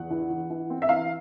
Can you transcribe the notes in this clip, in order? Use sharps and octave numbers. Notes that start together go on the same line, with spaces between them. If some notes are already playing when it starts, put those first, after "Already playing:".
Already playing: E2 F#5
E3
E3
E3
C4
E5
E3 F5